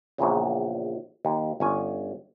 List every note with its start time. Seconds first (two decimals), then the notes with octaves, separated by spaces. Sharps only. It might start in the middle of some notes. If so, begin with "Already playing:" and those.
0.18 A#1 E2 A#2 C#3
1.25 D#2
1.60 G1 C#4 G#5